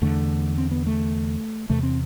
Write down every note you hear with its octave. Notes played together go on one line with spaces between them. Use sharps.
E2 D3 A3
C4
B3
A3
E2 C3 A3
C4